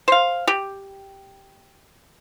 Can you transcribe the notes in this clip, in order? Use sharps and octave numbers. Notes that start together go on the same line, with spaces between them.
C5 F5
G4